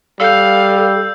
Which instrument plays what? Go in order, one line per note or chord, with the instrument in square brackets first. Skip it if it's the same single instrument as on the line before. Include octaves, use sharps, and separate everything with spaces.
[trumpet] G3 [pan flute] A4 [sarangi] F5 [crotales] E6 G6